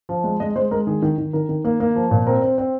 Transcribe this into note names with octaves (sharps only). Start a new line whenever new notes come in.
F3
G#3
G#3 D#5
G#3 C5
G#3 A#4
D#3 G#4
D#3
D#3
D#3 A#4
D#3
A#3
A#3
F3
A#2
C4 A#4
C4
C4